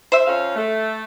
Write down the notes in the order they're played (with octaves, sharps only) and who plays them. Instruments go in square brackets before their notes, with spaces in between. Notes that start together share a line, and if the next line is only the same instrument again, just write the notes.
[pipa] C5 E5
[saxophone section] F2 C#4 F5
A3